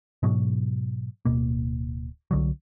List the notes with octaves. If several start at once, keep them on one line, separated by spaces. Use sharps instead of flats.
G#2 B2 F#3
D1 B2 A#3
C2 D3 F#3